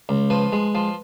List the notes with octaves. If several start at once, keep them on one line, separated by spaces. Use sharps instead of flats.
C#2
F3 B4
G#3
F3